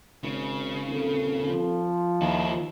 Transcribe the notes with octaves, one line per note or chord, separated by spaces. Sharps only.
G#1 C#3
D#1 C4 A4
F3
D#2 D#3 E4 F4